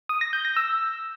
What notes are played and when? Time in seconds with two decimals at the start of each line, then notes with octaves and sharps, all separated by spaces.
0.09 D#6
0.21 A#6
0.33 G6
0.45 A#6
0.57 E6